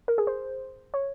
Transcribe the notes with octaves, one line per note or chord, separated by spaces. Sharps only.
A#4
G#4
C5
C#5